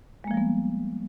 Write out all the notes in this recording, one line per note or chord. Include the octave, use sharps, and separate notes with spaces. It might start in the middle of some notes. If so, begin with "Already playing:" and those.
F3 G3 G#3 A#3 B3